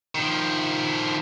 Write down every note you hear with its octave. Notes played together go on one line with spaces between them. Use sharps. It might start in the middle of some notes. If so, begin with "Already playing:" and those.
D#3 F3